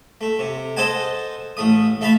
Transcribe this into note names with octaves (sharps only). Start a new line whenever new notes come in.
A3
C3
A4 C5 D#5 F#5 G#5 A5
A1 A3 D#6
A3 E5 F5 A5 B5